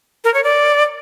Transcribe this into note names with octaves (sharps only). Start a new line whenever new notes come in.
A#4
C#5
D5